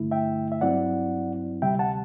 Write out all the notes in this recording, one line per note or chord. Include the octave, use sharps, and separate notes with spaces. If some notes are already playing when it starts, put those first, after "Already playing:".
Already playing: G2 D3 A3 E4
E5 G5
E5
G2 F#3 C4 E4 D5 F#5
D2 C3 G3 E5 G5
F#5 A5